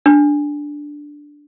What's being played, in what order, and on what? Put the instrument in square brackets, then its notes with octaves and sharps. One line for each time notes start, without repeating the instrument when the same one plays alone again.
[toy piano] D4